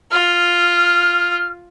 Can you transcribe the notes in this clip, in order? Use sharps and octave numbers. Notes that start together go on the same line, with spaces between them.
F4 F6